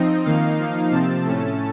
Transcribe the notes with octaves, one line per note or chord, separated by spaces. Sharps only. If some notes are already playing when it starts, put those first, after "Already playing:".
Already playing: F3 C4 D#4 D#5
D#3 A#3 D#4 F5
F3 A#3 D#4
C3 F3 C4 A5
A2 A3 C#4